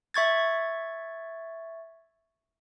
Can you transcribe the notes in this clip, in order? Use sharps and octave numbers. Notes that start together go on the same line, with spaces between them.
E5 C#6 G#6 A6